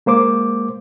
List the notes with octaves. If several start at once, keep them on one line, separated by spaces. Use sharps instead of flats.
G#3 A#3 C5 D6